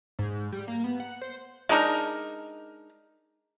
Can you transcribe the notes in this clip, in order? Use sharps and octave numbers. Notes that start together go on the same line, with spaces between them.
G#2
G3
A#3
B3
F#5
C5
G#3 D4 D#4 A#4